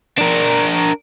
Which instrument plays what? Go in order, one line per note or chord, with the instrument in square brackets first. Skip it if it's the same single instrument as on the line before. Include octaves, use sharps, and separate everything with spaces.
[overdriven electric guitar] D4 A#4